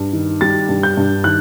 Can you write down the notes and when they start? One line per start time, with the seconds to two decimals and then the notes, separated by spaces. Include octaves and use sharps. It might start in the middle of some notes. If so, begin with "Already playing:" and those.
Already playing: G2
0.13 D#3
0.41 G3 A6
0.69 G2
0.83 G6
0.97 G2
1.24 D#3 F#6